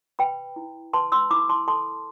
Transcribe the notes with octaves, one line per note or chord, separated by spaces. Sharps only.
B4 G5 B5
E4
B4 A5 C6
C6 E6
E4 B5 D6
A5 C6
A4 A5 C6